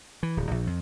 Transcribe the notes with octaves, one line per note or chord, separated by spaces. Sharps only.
E3
D1
A#1
F2